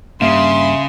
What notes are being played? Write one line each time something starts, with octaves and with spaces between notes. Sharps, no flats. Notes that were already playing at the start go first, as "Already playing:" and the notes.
G2 C#3 A#3 E5 F5 C6